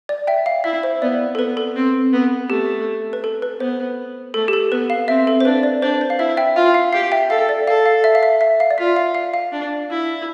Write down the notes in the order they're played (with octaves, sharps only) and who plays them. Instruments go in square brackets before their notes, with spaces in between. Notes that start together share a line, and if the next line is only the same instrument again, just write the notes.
[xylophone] D5
E5 G5
F5
[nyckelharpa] E4 [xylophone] E5
[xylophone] C5
[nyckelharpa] B3 [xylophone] D5
[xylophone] A4
[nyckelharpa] B3 [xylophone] B4
[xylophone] A4
[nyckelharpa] C4
B3
[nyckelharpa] A3 [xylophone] G4
[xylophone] B4
A4
B4
[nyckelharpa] B3 [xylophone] C5
[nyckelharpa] A3 [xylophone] A4
[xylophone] G4
A4
[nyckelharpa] B3 [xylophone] B4
[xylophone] F5
[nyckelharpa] C4 [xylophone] E5
[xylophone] A4
C5
[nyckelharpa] D4 [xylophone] B4
[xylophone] D5
[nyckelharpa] D4 [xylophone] C5
[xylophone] C5
F5
[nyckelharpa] E4 [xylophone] E5
[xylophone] E5 G5
[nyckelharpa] F4 [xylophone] F5
[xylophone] F5
[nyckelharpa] G4 [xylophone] F5
[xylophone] E5 G5
[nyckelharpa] A4 [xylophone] F5
[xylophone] D5
[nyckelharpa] A4 [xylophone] F5
[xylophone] F5
E5
F5
E5
E5
F5
D5
[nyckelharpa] F4 [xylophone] E5
[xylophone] F5
F5
F5
[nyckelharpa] D4
E4